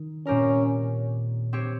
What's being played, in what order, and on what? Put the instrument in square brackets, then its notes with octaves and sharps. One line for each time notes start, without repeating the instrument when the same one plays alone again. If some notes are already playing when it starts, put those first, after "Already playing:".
Already playing: [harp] D#3
[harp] A#2 G3 C4 G4 A#4 [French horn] C#4
[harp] C4 G4 C#5